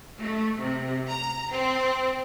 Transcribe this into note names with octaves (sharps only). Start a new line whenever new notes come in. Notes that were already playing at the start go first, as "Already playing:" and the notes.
A3
C3
A#5
C4